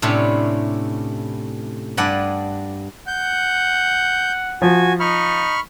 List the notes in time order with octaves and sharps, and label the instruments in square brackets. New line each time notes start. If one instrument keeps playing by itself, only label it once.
[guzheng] A2 C3 C#4 D4 E4
G2 D4 D5 F#5 G#5 B5
[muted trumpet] F#5 [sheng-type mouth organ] G6
[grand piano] F3 [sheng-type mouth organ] F#4 G#5
[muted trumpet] D#4 [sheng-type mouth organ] B5 C#6 F6